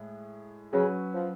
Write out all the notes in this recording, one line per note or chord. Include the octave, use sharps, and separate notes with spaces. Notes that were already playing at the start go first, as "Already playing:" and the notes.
Already playing: A2 G#3 G#4
C#3 F#3 C#4 F#4 B4
F3